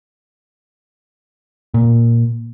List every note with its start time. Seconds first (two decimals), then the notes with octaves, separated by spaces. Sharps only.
1.74 A#2